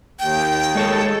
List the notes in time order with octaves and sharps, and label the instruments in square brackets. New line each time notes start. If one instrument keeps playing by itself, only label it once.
[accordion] D#2 [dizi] G5
[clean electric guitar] G#3 C#5 A5 [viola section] G#4 A4